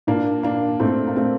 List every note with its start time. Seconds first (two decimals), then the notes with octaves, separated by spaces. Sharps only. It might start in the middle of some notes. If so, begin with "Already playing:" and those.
0.07 A#2 A#3 D4
0.43 A#3 D4
0.80 A#2 A3 C4
1.07 A#3
1.16 A3 C4